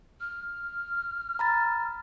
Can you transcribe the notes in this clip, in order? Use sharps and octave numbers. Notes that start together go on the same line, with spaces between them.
F6
A#5 B5 A6